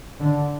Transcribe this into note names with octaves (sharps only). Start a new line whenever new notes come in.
D3